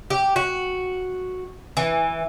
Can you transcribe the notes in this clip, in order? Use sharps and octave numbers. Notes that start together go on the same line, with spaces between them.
G4
F#4
E3